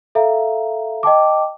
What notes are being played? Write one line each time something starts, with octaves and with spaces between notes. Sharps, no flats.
A4 E5 F5 A#5
D#5 G5 A5 D6